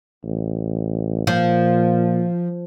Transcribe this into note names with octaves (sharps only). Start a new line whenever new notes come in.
A1
A#2 F3